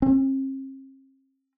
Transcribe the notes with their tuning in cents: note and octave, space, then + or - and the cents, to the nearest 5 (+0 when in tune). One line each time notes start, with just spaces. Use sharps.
C4 +45